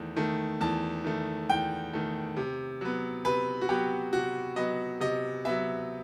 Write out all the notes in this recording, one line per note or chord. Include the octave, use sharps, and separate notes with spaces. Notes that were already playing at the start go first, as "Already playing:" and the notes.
Already playing: E2 D#3 A3
D#3 A3
E2 A5
D#3 A3
E2 G5
D#3 A3
C3
F#3 B3
C3 B4
F#4
F#3 B3 G4
C3 F#4
F#3 B3 D#5
C3 D#5
F#3 B3 E5